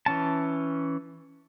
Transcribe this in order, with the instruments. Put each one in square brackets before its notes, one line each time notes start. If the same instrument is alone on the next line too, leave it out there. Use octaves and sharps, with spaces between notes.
[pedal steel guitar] E3 C#4 A5